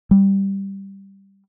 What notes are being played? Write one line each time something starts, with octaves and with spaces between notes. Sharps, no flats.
G3